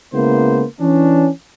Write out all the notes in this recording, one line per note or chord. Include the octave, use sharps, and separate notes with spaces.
C#3 G#3 A#3 B3 E4 C5
E3 C#4 D4